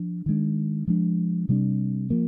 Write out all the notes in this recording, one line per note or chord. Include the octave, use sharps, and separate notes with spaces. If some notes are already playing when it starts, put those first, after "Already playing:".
Already playing: F3 D4
D#3 G#3 D4
F3 G#3 D4
C3 G3 D4
F3 A#3